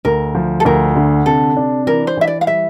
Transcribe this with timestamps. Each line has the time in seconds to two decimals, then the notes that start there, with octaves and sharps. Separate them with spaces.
0.05 D2 A#4
0.35 F3
0.60 A4
0.65 D2 A#4
0.96 D3
1.26 C3 A4
1.57 D4
1.87 E3 A#4
2.07 C5
2.17 E3 E5
2.27 D5
2.41 F5
2.47 G3 E5